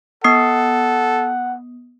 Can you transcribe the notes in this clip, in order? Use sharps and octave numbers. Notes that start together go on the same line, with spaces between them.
B3 A4 F#5 D#6 C7